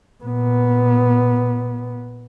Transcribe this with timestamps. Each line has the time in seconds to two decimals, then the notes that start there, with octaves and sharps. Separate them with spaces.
0.24 A#2 B3